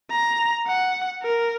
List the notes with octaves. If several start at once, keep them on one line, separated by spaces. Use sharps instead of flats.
A#5
F#5
A#4